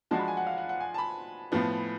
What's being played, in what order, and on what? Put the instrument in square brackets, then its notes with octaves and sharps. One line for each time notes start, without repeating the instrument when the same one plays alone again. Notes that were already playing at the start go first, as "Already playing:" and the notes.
[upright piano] F3 G#3 D4 F#4 [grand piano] A5
[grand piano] B5
G#5
F#5
F5
F#5
F#5
G#5
A5
B5
[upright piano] A2 F3 B3